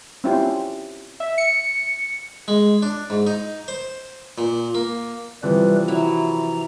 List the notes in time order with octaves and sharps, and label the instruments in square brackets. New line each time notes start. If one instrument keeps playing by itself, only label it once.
[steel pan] C4 C#4 E4 F4 G4 C5
[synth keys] E5
C#7
[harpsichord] G#3
D4
G#2
D#4
C5
A#2
A#3
[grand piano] C3 E3 F3 [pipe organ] G3 B4
[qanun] F#3 E4 [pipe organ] A#5